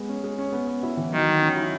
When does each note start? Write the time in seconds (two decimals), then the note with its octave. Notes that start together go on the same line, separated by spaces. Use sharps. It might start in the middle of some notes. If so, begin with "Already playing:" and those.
Already playing: G#3 B3
0.09 C#4
0.24 G#3
0.38 C#4
0.52 B3
0.67 B3
0.83 E4
0.97 E3
1.12 D#3 F#3
1.27 F#3
1.42 C#4
1.56 E4